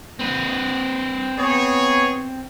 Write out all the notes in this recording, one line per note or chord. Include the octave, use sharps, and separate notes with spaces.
C4 B4
B3 G#4 C#5